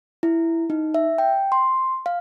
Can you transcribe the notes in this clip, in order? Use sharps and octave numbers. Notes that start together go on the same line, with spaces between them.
E4
D#4
E5
G5
C6
F5